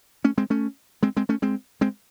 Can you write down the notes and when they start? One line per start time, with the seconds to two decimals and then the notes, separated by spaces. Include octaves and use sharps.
0.24 A3 C#4
0.38 G#3 C4
0.50 A3 C#4
1.03 G#3 C4
1.17 G#3 C4
1.29 A3 C#4
1.42 G#3 C4
1.81 G#3 C4